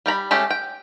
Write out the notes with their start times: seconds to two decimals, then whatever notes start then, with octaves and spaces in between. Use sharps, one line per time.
0.06 G3 G5 A#5 B5
0.31 G#3 A3 C#4 G4 A4
0.50 G5